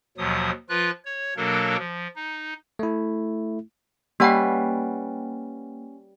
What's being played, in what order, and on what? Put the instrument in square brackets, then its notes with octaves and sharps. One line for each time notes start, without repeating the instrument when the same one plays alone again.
[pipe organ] D#2 B2 F3 F#3 D#6
F3 F4 B4 F#6
C#5
B2 F#3 A#3 D4 A4 A#4
F3
D#4
[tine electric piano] A3 E4
[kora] G3 C#4 B4 [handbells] A#3 F#5 G5